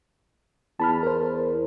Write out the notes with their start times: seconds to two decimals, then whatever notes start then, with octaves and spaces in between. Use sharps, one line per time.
0.80 E2 A5 B5 F6
1.03 A#4 C5